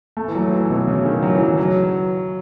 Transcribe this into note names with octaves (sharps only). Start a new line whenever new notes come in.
A3
E3
F#3
E3
B2
C#3
D#3
F#3
E3
F#3
F#3